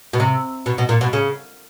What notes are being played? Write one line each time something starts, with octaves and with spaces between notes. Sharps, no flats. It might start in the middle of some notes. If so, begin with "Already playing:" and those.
B2
C3
B2
B2
A#2
B2
C#3